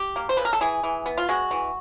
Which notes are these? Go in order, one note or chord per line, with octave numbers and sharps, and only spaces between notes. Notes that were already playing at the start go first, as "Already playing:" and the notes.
Already playing: G4
A#3
C5
C#3 B4
A#4
A4
E3 G#4
E3
B3
F4
G#3 F#4
E3